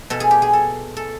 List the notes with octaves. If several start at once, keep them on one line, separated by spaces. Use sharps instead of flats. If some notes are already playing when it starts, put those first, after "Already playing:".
B2 A4
G#4
G4
G#4
A4
A4